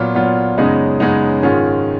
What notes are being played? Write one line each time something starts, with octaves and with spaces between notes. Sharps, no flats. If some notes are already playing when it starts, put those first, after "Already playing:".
Already playing: A#2 F#3 B3 F4
A#2 F#3 B3 F4
F#2 C#3 G#3 B3 D#4
F#2 C#3 G#3 B3 D#4
G#2 D#3 G#3 C#4 F4